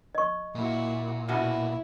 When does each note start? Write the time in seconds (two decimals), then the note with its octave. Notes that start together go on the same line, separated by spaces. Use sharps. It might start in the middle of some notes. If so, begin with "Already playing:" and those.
0.15 D#5 C#6
0.55 A#2 E4 F#4
1.28 F#2 B2 E4 F#4